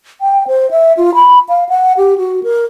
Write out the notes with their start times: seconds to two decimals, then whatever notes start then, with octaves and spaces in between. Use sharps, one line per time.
0.21 G5
0.47 C5
0.71 E5
0.97 F4
1.15 B5
1.49 F5
1.69 F#5
1.97 G4
2.18 F#4
2.43 A#4